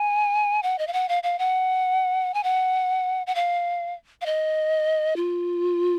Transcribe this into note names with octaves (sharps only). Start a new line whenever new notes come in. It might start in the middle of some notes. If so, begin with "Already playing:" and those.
Already playing: G#5
F#5
D#5
F5
F#5
F5
F5
F#5
G#5
F#5
F#5
F5
F5
D#5
F4